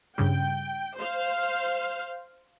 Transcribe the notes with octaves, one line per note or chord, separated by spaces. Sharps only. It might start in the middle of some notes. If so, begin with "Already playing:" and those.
G2 C#3 G3 G5
C5 F5